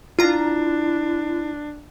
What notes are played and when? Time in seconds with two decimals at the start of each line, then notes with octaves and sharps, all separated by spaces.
0.19 D4 E4 F4 A#5